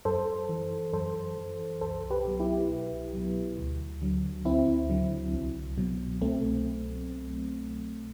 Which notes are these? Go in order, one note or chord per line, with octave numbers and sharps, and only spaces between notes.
F#2 A4 C5
E3
F#2 A4 C5
E3
C2 A4 C5
G4 B4
B2 F#3
E4 G4
C2
B2 F#3
D2
D3 F#3
D2 C4 E4
D3 F#3
C2
B2 F#3
C2 A3 C4